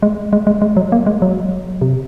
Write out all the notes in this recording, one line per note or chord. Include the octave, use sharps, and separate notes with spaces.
G#3
G#3
G#3
G#3
F#3
A#3
G#3
F#3
C3